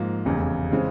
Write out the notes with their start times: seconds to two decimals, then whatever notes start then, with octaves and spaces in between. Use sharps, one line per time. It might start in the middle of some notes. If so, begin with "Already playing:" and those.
Already playing: G#2 F3 A#3
0.25 F1 E2 C#3
0.71 C#3 E3 G#3 C4